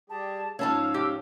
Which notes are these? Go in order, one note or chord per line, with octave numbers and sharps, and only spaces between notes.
G3 G4 G#4 A5
G#2 F3 C#4 D#4 C#5 F5 A5 E6
G4